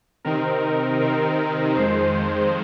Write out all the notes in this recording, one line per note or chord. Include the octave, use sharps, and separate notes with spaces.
C3 D#3 C4 D#4 A#4
C3 D#3 C4 D#4 A#4
A#4
F2 D#3 G#3 C5